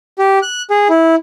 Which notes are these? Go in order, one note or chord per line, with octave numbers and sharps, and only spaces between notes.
G4
F#6
G#4
E4